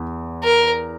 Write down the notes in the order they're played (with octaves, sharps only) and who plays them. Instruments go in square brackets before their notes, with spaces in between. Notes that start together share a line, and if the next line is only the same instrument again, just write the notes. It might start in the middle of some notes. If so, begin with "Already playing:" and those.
Already playing: [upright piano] E2
[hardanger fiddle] A#4